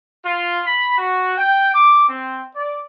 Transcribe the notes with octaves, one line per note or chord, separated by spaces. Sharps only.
F4
B5
F#4
G5
D6
C4
D5